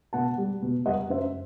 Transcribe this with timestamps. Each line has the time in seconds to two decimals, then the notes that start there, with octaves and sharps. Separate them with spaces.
0.13 B2 F#5 A5
0.38 G3
0.62 B2
0.86 G3 D#5 F#5
1.10 F#2 C5 E5